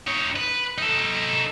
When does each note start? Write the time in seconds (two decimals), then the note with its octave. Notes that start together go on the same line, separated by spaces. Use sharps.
0.07 D#4 C#5
0.36 B4
0.78 D#4 A4